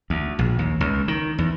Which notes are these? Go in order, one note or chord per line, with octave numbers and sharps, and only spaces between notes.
D2
A#1
D#2
C#2
D#3
E2